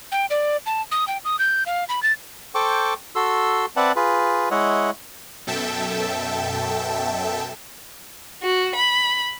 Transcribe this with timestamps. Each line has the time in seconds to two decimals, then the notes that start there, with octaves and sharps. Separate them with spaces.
0.12 G5
0.30 D5
0.66 A5
0.92 D#6
1.08 G5
1.25 D#6
1.39 G6
1.66 F5
1.89 B5
2.03 A6
2.55 A4 C5 G5 C#6 D6
3.15 F#4 A4 C6 E6
3.76 C4 B4 D5 E5 F#5 A5
3.96 F4 G#4 B4
4.51 G#3 E4 C#5 D#5 E5 F#5
5.47 F#2 B2 A4 E5 G5 A5
8.43 F#4
8.76 B5